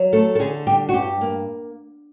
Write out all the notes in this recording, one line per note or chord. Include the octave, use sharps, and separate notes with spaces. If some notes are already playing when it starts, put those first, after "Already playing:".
Already playing: F#3
A3 A4
A4
D3 G#4
G3 G4
F#4
G2 G4
A#3